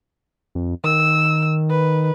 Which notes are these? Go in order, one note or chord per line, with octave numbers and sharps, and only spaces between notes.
F2
D#3 E6
B4